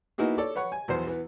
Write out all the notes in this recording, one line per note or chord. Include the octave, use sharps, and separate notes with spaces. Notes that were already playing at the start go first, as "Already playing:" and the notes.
A#3 B3 D#4 E4 F#4 G#4
A4 C#5 D5
B4 C#5 F#5 C#6
G#5
B1 E2 B3 C5
E3 B3